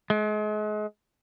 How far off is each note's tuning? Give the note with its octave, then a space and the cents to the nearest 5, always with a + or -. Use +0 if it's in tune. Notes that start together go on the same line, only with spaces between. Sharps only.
G#3 +35